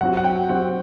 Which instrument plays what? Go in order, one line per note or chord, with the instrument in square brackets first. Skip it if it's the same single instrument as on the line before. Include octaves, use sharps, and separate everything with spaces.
[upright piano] F#3 C4 F#4 [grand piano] F#5
[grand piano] F#5
G5
[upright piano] F#3 C4 F#4 [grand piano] F#5